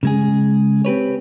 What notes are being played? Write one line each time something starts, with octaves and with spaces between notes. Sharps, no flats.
C#3 G#3 G#4
C4 G4 B4 C#5